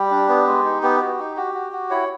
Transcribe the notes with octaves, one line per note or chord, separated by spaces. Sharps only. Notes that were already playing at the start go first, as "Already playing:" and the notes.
Already playing: G3 G4
D4
B3
G#3
D#4
B3 G4
F#4
D#4
F#4 G4
F#4
F#4
E4 C#5